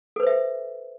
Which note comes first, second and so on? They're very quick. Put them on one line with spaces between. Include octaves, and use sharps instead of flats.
A4 B4 C5 E5